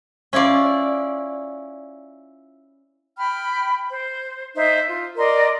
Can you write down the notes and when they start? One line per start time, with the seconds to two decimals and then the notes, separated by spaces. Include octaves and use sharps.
0.33 C#4 E4 F4 D5
3.18 G5 B5 F6
3.89 C5
4.56 D#4 C5 E5
4.87 F4
5.17 A#4 D5 D#5 C6